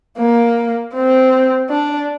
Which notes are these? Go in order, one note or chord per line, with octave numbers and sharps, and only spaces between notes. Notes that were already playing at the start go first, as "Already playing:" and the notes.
A#3
C4
D4